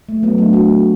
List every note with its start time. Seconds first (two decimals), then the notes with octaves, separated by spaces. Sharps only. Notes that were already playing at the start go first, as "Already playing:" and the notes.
0.09 A3
0.23 F#3 B3
0.38 A3 D4
0.53 D4 F#4